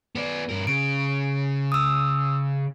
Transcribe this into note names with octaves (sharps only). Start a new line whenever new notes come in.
B3 D5
G2 A#4
C#3 D7
D#6 E6